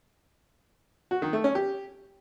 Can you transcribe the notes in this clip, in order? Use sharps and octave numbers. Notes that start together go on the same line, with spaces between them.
F#4
D#3
A3
C#4
G4